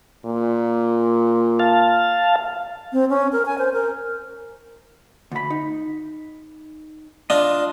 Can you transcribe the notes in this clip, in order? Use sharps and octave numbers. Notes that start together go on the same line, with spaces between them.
A#2
F5 A5
C4
C#4
A#4
G#5
C5
A#4
D2 B5
D#4
D4 F4 D#5 D#6